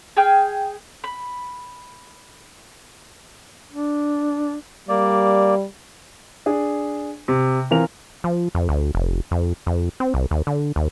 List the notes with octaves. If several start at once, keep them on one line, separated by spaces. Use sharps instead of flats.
G#4 G5 F6 G6
B5
D4
G3 A#3 D5
D4 G#4
C3
E3 C4 F4 A#4 F7
F3
F2
D2
F1
F2
F2
C4
C2
D#2
D3
D#2